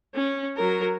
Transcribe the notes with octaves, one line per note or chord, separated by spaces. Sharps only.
C#4
F#3 A#4